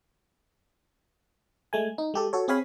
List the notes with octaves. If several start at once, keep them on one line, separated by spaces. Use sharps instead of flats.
G#3 A3 G#5
D#4
G#3 G4 A4
F#4 A4 C#5
C4 G#4 C#5 F5 G#5 B5